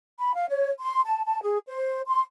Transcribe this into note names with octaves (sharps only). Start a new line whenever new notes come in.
B5
F5
C#5
C6
A5
A5
G#4
C5
C6